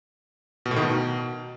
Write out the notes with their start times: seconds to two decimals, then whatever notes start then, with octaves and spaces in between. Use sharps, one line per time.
0.66 B2
0.71 A2
0.76 D#3
0.82 B2